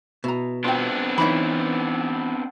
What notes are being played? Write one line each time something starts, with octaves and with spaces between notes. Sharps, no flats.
B2 E4 A#5
B3 C4 D4 F4 G5
E3 D#4 E4 C#5 B5